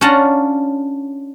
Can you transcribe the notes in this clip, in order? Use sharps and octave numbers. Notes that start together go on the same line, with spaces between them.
C#4 D4 F4 F#5 A5 A#5